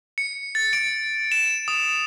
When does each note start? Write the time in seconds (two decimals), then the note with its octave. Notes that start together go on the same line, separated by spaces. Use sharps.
0.18 C#7
0.55 A6
0.73 D7
1.32 E7
1.68 D#6